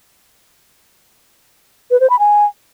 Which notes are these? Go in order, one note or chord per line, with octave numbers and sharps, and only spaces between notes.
B4
C5
B5
G#5